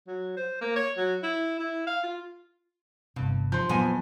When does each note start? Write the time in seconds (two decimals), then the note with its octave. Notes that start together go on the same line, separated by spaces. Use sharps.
0.07 F#3
0.37 C5
0.61 A#3
0.76 C#5
0.97 F#3
1.23 E4
1.59 E4
1.87 F5
2.04 F4
3.16 G1 G2 C3
3.52 F3 C6 G6
3.69 F2 A#2 F#3 B3 G#5